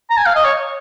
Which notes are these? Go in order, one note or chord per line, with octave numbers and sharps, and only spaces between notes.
A#5
G#5
F5
D#5
C#5